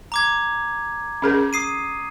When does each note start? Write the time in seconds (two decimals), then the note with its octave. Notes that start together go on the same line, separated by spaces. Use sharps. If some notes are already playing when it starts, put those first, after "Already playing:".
0.12 A#5 D6 G#6
1.22 C#4 G#4 A#4
1.53 D#6 C7 D#7